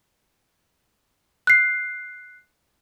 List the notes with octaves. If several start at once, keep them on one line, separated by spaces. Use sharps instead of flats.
F#6 C7